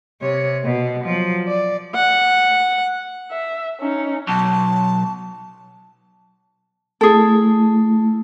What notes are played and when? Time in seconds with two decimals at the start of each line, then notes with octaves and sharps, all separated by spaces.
0.22 C3 C#5
0.64 B2
1.05 F3 F#3
1.47 D5
1.95 F#5
3.31 E5
3.80 C#4 D#4
4.28 B1 A5
7.01 A3 E4 G#4 A4